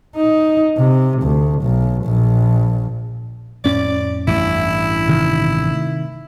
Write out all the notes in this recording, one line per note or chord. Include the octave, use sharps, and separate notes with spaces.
D#4
C3
D2
B1
A#1
F2 A2 C#4 D5
A1 G2 E4
C3 D#3